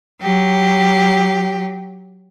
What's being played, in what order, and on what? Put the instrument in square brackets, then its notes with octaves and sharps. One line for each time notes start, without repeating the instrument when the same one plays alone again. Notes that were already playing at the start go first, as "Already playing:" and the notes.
[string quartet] F#3 G4